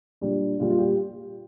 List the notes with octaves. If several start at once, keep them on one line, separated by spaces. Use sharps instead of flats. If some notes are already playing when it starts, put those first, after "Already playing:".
A#2 G3 D4
A#2 G3 F4
F4
G4